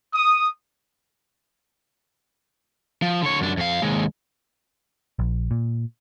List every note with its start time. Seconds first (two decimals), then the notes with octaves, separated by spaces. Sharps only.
0.14 D#6
3.02 F3
3.22 D3 C#5
3.41 F#2 D4
3.57 F2 F5
3.82 D#2 G#3
5.19 A#1
5.51 A#2